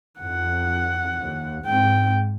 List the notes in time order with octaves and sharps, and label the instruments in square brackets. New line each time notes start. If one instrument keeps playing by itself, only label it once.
[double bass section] F2 [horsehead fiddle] F#5
[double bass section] D#2
[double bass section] G#2 [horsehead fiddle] C4 G5